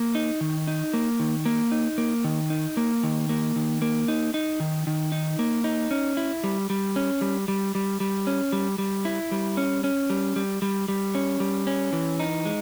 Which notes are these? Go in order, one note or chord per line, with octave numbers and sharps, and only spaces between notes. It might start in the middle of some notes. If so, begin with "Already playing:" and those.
Already playing: A#3
D#4
D#3
D#4
A#3
D#3
A#3
D#4
A#3
D#3
D#4
A#3
D#3
A#3
D#3
A#3
D#4
D#4
D#3
D#3
D#4
A#3
D#4
C#4
E4
G3
G3
C#4
G3
G3
G3
G3
C#4
G3
G3
E4
G3
C#4
C#4
G3
G3
G3
G3
C#4
G3
C#4
E3
D#4
G#3